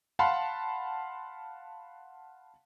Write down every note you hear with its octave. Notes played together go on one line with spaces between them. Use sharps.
F5 F#5 A5 B5 C6